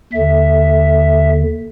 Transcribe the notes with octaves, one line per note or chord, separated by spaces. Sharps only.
D#2 D3 E5